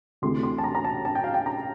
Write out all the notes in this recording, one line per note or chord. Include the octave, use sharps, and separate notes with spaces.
D2 C3 E3 A3 C6
C6
A5
A#5
A#5
A5
A5
G5
F5
G5
A#5